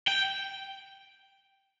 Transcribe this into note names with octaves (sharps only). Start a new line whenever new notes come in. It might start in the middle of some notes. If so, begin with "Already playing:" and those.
G5